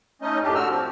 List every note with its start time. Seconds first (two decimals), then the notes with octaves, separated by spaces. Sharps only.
0.22 A3 C#4 D#4 D#5
0.43 F#2 A2 D4 G4
0.55 D3 F#4 E6 F6
0.69 F3 C4